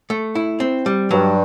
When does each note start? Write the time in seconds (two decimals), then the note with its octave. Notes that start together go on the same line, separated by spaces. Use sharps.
0.10 A3
0.35 E4
0.60 C4
0.86 G3
1.11 G2 F#3